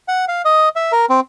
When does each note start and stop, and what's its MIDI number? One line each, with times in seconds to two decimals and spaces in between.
0.08 0.25 78
0.28 0.42 77
0.45 0.69 75
0.76 0.92 76
0.92 1.06 70
1.10 1.20 60